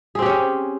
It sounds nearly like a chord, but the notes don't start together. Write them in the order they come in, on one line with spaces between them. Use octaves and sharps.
G#4 C4 G4 C#4